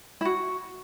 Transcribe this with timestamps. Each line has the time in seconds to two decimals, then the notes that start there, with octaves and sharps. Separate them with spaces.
0.21 E4
0.25 F#4